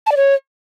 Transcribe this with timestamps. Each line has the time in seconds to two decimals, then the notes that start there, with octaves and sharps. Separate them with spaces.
0.07 A5
0.12 D5
0.17 C#5